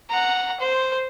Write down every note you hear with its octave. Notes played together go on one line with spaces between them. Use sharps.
F#5 A#5
C5